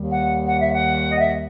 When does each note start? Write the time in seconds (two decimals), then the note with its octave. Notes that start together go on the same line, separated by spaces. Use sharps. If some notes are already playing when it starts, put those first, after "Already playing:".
Already playing: D#2 D#3 G3
0.11 F#5
0.46 F#5
0.60 E5
0.73 F#5
1.11 D#5
1.18 E5